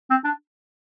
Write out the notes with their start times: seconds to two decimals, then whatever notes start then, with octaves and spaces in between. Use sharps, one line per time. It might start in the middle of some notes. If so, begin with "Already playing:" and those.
0.10 C4
0.25 D4